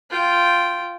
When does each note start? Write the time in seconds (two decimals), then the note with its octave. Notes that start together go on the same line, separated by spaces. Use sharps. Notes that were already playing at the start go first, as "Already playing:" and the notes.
0.10 F4 G5